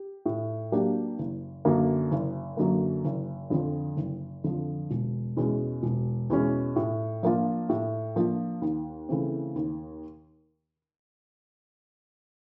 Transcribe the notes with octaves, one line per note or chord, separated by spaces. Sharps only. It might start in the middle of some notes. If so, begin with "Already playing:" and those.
Already playing: G4
A2
F#3 A#3 D4 G4
F#1
F#2 D3 F#3 A#3
F#1
F#2 D3 F#3 A#3
F#1
F2 D3 F3
F#1
F2 D3 F3
E1
E2 B2 G#3 C#4
E1
E2 B2 G#3 C#4
A2
F3 A#3 D4 F4
A2
F3 A#3 D4 F4
D#2
C#3 E3 A3 C4
D#2